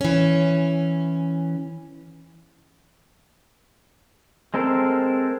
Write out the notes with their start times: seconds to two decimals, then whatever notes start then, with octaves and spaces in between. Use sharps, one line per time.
0.01 E3 C#4
4.54 G#3 C4 A4 A#4 C5